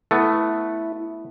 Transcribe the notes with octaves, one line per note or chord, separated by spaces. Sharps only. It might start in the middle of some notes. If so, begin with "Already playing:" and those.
A3 B3 E4